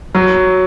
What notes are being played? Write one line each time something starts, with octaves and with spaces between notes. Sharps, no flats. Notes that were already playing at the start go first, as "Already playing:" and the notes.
F#3